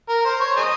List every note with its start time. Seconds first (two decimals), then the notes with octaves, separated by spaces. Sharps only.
0.09 A#4
0.25 C5
0.40 C#5
0.57 G#4 C5 D#5